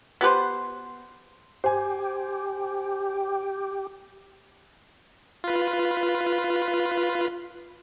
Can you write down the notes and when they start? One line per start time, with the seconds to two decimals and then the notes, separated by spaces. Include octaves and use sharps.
0.21 B3 G4 B4 C5
1.64 G4 C5 G#5
5.44 F4 B4